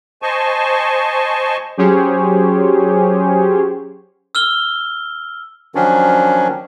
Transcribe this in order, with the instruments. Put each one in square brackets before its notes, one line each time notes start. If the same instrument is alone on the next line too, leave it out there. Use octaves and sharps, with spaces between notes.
[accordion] C5 D#5 G#5 A5 C#6
[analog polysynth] F#3 C#4 G4 G#4 C5 C#5
[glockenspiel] E6 F6 G7
[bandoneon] D#3 F3 F#3 C#4 D4